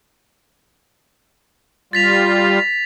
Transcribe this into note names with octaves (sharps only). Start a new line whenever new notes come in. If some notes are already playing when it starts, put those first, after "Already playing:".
G3 F4 A6 B6 F7